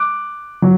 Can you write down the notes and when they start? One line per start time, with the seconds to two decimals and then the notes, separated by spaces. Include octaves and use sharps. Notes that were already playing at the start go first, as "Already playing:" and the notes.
Already playing: D6 F#6
0.62 F#3